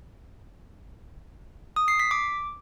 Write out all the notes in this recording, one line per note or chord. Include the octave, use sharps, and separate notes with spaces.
D#6
C7
B6
D6